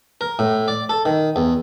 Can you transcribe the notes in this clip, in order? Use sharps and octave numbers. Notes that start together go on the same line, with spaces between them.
A#4
A2
D5
A4
D#3
E2